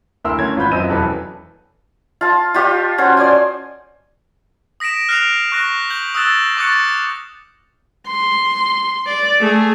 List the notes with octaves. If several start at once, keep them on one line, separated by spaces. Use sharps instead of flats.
D2 E4 A#4 C6 E6
A3 C#4 G#6
G#1 F4 B4 B5 G6
F#2 C4 F4 D#5 E6 D#7
E1 F#2 E3 A4 B4
F4 A5
F4 G4 D#5 C#6
C#4 F#4 C5
C5 D5 D#5 G#5
D#6 A#6 B6 D7 E7
F6 F#6 A#6 C7 D7 F7
C#6 F#6 A#6
G6 F#7
D#6 E6 F#6 A6 E7
C#6 D6 F#6 A6 C#7
C6
D5
A3 G#4